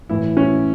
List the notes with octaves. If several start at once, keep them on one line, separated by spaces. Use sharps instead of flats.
A2 E3 E4
C#4